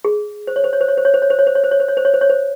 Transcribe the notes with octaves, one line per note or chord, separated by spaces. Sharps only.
G#4
C5
C#5
C5
C#5
C5
C#5
C5
C#5
C5
C#5
C5
C#5
C5
C#5
C5
C#5
C5
C#5
C5
C#5
C5
C#5
C5